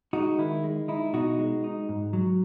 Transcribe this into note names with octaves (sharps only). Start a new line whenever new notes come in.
G#3 D#4 F#4
D#3 E4
G#3
D#4 E4
B2 D#4 F#4
G#3
D#4
G#2
F#3